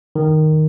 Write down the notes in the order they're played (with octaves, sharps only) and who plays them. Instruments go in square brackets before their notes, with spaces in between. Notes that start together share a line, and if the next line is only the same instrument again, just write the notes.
[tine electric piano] D#3